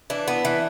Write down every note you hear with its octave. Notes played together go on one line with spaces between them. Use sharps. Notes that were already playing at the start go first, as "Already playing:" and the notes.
E3 D4
B3
E3